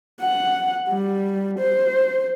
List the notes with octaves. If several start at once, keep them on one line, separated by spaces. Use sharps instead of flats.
F#5
G3
C5